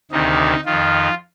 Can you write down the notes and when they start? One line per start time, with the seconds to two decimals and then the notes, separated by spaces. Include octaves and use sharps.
0.11 D2 C3 D#3 D#4
0.65 F2 D#3 F4